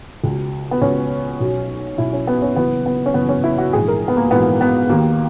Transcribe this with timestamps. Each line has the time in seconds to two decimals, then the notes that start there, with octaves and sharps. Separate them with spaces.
0.24 C#2
0.29 B2
0.71 B3
0.82 C#2 B2 C#4
1.40 B1 B2
1.98 B1 B2 E4
2.13 C#4
2.27 B3
2.42 C#4
2.56 F#1 F#2 E3 B3
2.86 B3
3.06 C#4
3.14 F#1 F#2 E3 B3
3.29 C#4
3.44 E4
3.58 F#4
3.73 A#1 G#2 E3 G#4
3.88 A#4
4.08 B3
4.17 A#3
4.31 A#1 G#2 E3 B3
4.61 B3
4.89 D#2 D#3 A#3